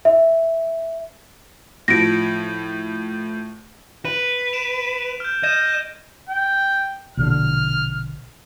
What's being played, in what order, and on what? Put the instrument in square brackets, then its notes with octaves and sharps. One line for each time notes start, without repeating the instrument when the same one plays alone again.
[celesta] E5
[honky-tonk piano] A2 F3 [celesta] A#6 D7
[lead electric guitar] B4
[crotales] D7 E7 F7
F6 G6
[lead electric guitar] D#5 [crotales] G6 G#6 E7
[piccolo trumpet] G5
[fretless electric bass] A#1 B2 D3 [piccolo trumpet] F6